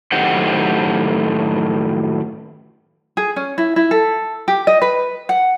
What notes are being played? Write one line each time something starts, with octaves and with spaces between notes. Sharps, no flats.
F#2 A2 D#3 G4 C5 F#5
G#4
C#4
E4
E4
A4
G4
D#5
B4
F#5